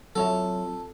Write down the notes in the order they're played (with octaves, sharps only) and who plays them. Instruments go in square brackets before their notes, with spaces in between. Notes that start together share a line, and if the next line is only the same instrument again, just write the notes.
[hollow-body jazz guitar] F#3 C#5 E5 [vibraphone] C4 F4 [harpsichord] A4